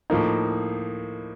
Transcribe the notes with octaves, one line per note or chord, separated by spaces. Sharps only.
A2 F3 A#3 D#4